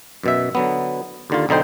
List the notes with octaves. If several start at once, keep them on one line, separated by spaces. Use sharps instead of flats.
F#2 B2 E5
D3 F#3 B3
D#2 D3 F4
B1 D3 D#4 C5 G5